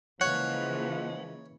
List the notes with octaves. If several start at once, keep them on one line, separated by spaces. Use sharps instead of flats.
C#3 E3 F3 G#3 A#3 C#5 F#5